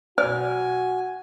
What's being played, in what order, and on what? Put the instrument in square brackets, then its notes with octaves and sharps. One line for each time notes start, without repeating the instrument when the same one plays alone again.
[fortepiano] B1 F6 [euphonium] F#4 [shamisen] D5 [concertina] G#5